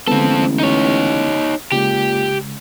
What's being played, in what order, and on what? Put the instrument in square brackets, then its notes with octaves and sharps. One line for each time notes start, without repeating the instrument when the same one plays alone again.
[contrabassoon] A1 [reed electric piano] D3 G#3 B3 [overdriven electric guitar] C4 A4
[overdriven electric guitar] D#4 C#5
[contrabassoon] A#2 [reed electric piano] C#3 G#3 [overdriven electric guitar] G4